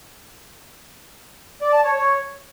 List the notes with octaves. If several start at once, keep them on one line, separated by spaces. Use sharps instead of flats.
D5
A5
C#5
C#5